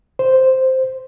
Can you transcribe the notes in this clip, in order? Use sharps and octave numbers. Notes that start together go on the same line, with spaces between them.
C5